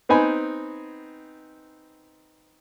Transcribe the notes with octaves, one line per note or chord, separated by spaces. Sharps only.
B3 C4 D#4 G#5 B5